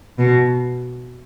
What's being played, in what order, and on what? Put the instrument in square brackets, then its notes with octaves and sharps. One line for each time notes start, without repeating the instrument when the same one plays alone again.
[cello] B2